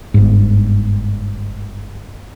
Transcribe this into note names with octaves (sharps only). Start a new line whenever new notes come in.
G1 G#2